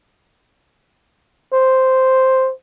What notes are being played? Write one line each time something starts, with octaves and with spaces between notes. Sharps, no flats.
C5